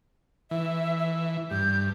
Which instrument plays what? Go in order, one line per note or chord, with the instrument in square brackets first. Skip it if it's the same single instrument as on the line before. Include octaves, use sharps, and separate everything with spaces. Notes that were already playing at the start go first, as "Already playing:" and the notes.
[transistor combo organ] E3 [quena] E5
[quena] E5
[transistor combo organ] G2 [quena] G6